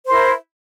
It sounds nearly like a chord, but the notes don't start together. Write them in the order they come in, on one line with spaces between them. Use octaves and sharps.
C5 A#4 E4